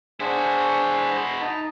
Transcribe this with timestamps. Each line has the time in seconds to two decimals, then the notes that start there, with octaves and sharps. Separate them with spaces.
0.20 D4 E4 F#4 G#4 C5
1.41 D#4 A5 A#5